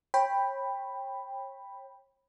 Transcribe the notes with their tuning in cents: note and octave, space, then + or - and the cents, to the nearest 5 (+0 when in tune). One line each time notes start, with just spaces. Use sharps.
C#5 -35 G5 +10 B5 +0